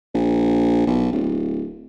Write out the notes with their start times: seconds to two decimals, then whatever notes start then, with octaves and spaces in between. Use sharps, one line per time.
0.15 A#1
0.87 B1
1.12 D1